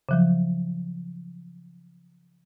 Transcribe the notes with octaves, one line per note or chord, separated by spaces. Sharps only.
C#3 F3 F#3